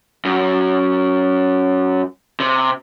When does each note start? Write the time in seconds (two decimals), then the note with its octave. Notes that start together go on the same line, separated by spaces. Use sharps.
0.25 F#2
2.40 C3